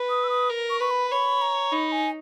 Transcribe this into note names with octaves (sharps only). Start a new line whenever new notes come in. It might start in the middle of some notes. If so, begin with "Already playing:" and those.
Already playing: B4
D#6
E6
D#6
A#4
C#6
B4 C#6
B5
C#5 B5
A#5
D#4 B5
G#5